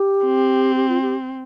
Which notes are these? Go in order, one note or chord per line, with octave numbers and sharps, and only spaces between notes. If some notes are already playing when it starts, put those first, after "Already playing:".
Already playing: G4
C4
G4
F4
G4